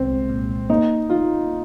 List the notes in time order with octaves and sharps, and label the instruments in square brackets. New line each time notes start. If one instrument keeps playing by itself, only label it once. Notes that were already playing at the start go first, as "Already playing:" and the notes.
Already playing: [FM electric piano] C2 G#3 [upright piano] C4
[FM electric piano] A#2
[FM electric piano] A#3 [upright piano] D#4
[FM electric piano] D#4 [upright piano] F4